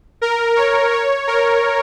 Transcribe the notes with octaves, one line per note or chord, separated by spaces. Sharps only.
A#4
C#5
C#5
A#4